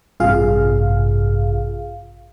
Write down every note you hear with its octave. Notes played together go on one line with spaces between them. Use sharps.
A1 G2 C3 F4 G#4 F5